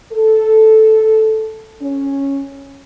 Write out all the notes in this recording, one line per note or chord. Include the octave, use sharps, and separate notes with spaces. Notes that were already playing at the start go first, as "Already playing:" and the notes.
A4
C#4